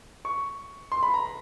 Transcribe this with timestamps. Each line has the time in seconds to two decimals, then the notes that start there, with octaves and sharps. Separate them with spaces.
0.25 C#6
0.92 C6
1.03 B5
1.14 A#5